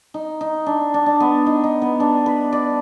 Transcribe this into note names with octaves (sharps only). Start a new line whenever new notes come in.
D#4
D#4
D4
D4
D4
B3
D#4
D#4
B3
D4
B4
D5